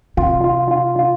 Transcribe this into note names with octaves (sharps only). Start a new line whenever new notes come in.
C3 F4
F4
F4
F4